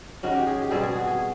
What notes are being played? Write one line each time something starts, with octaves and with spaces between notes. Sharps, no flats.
D#3 G#3 C#4 F#4
G4
G#4
G4
B2 G3 C4 G#4
G#4
F#4
G#4